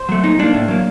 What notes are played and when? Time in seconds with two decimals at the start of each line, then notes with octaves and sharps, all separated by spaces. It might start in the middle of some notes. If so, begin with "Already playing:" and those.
Already playing: C5
0.09 F#3 A3
0.24 A#2 D#4
0.39 G3 A#3 D4
0.54 A2
0.68 F#3 A#3